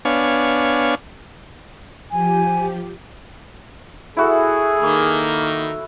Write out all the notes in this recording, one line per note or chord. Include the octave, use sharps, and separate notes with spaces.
B3 D4 C#5 F5 G#5
F3 G4 G#5
E4 F#4 G#4 A4
D#3 A#3